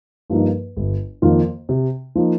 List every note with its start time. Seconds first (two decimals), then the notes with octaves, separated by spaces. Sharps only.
0.30 G2 F3 A#3 D#4
0.77 G1
1.22 F2 D#3 A#3 F4
1.69 C3
2.15 F3 A#3 D#4